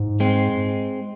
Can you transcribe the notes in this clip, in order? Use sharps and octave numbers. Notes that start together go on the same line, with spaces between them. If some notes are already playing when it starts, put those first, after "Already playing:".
Already playing: G#2
G#3 C4